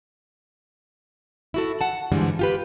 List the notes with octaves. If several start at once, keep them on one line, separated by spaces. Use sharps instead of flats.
E4 F#4 A4
F#5 A5
G2 D3 E3 F3 G3 G#3
F4 G4 B4